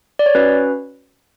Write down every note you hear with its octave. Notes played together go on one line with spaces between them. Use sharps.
D5
C#5
C#4 F#4 B4